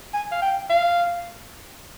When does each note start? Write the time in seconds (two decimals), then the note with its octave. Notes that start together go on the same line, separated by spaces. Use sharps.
0.14 G#5
0.32 F5
0.42 G5
0.70 F5